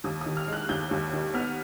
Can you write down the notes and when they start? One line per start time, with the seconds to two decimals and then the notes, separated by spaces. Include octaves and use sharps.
0.04 D#2 D#6
0.21 D#3 D#6
0.37 F6
0.48 G#3 F#6
0.69 D#2 G6
0.91 D#2
1.13 D#3
1.34 B3 F6